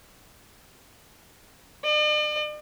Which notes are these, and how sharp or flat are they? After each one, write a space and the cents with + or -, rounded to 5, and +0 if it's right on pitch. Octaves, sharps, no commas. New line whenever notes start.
D5 +45